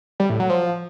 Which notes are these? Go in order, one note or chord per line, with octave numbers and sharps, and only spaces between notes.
G3
A2
F#3
F3